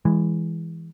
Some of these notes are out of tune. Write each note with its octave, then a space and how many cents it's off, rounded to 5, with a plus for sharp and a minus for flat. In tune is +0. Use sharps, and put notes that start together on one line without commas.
E3 +0 G#3 -10